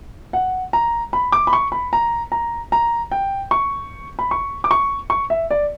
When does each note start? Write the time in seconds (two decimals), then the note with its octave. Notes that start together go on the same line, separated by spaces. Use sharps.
0.33 F#5
0.73 A#5
1.13 B5
1.32 D6
1.47 B5
1.53 C#6
1.72 B5
1.93 A#5
2.32 A#5
2.72 A#5
3.11 G5
3.51 C#6
4.19 B5
4.31 C#6
4.64 D6
4.71 C#6
5.10 C#6
5.30 E5
5.51 D5